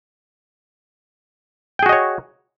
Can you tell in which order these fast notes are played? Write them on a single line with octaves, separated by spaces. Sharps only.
G5 G#4 F#4 D#5 C#5